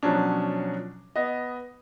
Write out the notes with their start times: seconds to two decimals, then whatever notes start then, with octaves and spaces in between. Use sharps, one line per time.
0.03 B2 F3 F#3 C#4 D4
1.16 B3 D#5